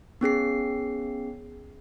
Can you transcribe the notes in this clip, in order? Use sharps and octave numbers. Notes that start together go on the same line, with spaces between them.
B3 C#4 G#4 C7